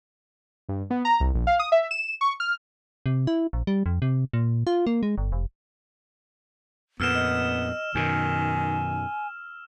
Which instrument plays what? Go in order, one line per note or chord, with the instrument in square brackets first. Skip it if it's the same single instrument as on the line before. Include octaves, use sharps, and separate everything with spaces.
[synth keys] G2
B3
A#5
C2
A#1
F5
D#6
E5
E7
C#6
F6
[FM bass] C3
E4
A#1
G3
F2
C3
A#2
F4
A#3
G#3
G1
F1
[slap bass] F2 A#2 [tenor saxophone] B3 [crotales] E6 F6 E7
[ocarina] D#5 [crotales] F6
[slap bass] F#2 B2 [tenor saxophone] D#3 [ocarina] G#5